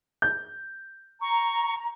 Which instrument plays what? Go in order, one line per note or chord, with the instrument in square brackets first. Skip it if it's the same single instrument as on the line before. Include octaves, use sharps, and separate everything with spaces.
[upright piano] G6
[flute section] A#5 [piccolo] C#6